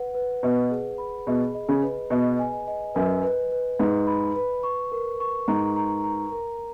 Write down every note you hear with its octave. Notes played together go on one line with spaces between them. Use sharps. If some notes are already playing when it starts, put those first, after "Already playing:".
Already playing: B4 F#5
B4
B2 B4
G#4
B5
B2 G#4
D#5
C#3
B4
B2 D#5
G#5
D#5
F#2 B4
B4
B4
G#2 B4
B5
B4
C#6
A#4
C#6
G#2 A#5
A#5
A#5
A#4